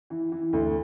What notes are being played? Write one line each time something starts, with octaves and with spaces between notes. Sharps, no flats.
E3
E3
D2